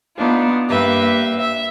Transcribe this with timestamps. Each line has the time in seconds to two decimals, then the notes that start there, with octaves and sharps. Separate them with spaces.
0.17 B3 D4 D#4 F4
0.69 G2 A#3 G4 B4 E5
1.39 E5